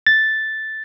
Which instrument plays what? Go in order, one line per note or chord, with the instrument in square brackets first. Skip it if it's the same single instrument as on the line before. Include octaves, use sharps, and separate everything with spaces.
[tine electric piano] A6